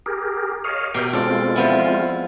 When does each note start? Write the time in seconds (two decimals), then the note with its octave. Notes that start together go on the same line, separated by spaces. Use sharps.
0.06 G4 G#4 A#4
0.64 C#5 D#5 F5
0.94 B2 G4 A#4 G5
1.13 G#3 C4 F4 A4 D5
1.56 F3 B3 E4